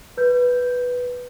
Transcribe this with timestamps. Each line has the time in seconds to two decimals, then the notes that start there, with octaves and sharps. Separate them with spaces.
0.17 B4 G6